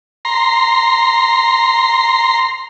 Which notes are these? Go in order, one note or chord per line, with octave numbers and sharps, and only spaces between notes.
A#5 C6